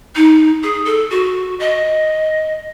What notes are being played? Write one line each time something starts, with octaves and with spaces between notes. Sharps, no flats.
D#4
G#4
A4
F#4
D#5